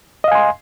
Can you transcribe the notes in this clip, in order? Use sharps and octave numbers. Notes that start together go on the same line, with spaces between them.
D#5 F5 G#5 C6